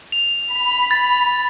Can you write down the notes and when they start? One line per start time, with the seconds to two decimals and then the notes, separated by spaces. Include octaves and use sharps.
0.12 F7
0.54 B5
0.91 A6